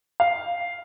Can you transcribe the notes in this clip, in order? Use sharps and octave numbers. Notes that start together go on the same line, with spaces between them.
F5